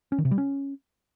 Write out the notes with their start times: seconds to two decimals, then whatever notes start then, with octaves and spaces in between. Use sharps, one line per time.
0.12 C#4
0.18 D#3
0.25 C3
0.31 G3
0.38 C#4